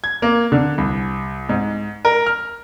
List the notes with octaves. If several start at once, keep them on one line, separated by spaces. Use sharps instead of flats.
G#6
A#3
D3
C2
G#2
A#4
F6